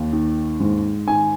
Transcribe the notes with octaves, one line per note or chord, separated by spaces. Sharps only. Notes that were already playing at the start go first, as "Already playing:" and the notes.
Already playing: D#2
D#3
G#2
D#3 G#5